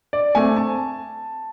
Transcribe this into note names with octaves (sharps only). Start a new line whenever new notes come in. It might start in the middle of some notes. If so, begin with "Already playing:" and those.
D5
A3 C4 G#5
A5